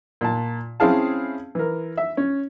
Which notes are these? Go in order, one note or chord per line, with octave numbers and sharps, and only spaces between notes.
A#2 A5
C4 C#4 E4 G#4 F5 A5
E3 A#4
E5
C#4